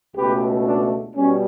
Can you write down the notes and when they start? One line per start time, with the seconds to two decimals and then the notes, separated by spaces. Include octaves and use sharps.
0.16 C#2 B2 A3 G4 B4
0.66 D4
1.14 B2 G3 C#4